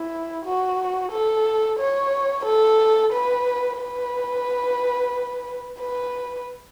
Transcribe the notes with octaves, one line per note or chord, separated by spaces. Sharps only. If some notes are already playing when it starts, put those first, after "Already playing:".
Already playing: E4
F#4
A4
C#5
A4
B4
B4
B4